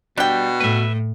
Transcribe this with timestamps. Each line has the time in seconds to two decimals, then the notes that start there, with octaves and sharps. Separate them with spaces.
0.18 B2 G3 D4 G5
0.61 A2 B4 E5